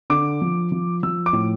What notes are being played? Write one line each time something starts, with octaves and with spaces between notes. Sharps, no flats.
D3 D6
F3
F3
F3 E6
D6
A2